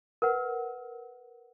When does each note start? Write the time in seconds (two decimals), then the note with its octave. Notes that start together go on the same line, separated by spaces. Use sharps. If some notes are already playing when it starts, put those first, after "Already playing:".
0.22 A#4 B4 F#5